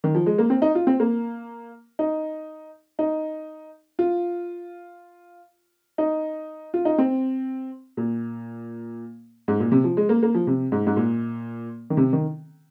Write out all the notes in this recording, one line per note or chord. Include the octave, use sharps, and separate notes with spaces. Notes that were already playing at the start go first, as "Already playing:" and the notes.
D#3
F3
G#3
A#3
C4
D#4
F4
C4
A#3
D#4
D#4
F4
D#4
F4
D#4
C4
A#2
G#2
A#2
C3
F3
G#3
A#3
A#3
F3
C3
G#2
G#2
A#2
D#3
C3
D#3